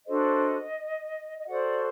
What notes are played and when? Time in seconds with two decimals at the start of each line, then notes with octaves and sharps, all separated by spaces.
0.06 D4 F#4 A4 C5 D#5
1.38 D#5
1.47 F#4 A4 C5 D5 F#5